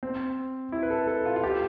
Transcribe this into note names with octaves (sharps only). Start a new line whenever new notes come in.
C4
E4
B4
A4
A4
F4
F4
G4